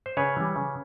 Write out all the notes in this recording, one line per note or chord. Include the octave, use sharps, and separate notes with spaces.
C5
C#3 B4 C#5
E3 G3
C#3